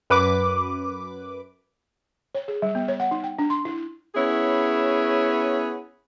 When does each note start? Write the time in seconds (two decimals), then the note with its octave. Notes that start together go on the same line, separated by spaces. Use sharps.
0.10 F#2 B4 D6
2.35 C#5
2.48 G#4
2.62 G3
2.75 B3
2.88 C#5
3.00 F#5
3.11 D#4
3.24 G5
3.39 D4
3.50 C6
3.65 E4
4.15 B3 C#4 E4 G#4 C#5